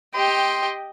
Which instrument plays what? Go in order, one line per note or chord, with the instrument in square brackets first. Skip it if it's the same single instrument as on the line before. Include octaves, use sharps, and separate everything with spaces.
[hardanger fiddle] G4 D#5 [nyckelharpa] G5 [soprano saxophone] C6